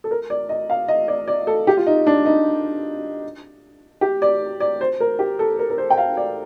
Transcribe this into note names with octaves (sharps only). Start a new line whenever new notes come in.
A4
A#4
D5
D#5
F5
D#5
D5
D5
A4
G4
F4
D#4
D4
D#4
G4
D5
D5
C5
A#4
G4
A4
A#4
A#4
C5
G5
F5
D5